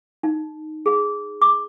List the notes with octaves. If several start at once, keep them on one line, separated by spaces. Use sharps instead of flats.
D#4
G#4
D6